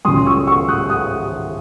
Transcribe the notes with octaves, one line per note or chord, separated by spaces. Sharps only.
C#2 C#3 F#3 C6 D#6
C#6 E6
C#6 E6
D#6 F#6
D#6 F#6